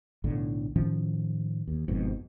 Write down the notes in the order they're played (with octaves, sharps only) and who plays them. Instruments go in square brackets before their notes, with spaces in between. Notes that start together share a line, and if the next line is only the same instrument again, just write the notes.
[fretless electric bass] B1 A2 D3
A2 D#3 F3 C#4
D#2
G1 F2 G#2 B2